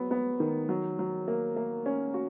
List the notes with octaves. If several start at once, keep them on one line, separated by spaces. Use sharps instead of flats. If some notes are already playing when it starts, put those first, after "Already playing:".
Already playing: F#3 B3
B3
D#3
F#3
F#3
A#3
A#3
C#4
F#4